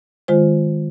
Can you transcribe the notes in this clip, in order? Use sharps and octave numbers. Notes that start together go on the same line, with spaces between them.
D#3 G#3 F4 C5